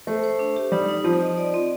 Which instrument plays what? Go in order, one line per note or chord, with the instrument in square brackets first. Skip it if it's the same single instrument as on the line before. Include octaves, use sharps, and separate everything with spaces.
[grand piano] A3 [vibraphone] C5
[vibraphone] C5
D4
G4
[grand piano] G3 [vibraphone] D#4
[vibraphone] D#4
[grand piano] F3 [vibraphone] C4
[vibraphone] D#5
D5
C4